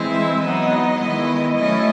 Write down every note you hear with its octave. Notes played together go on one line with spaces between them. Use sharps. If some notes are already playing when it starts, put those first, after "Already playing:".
Already playing: E3 G#3 C4 E4
E5
F#3 B3 D#4 D#5
D#3 G#3 B3 E4
F#3 A3 C#4 E4 D#5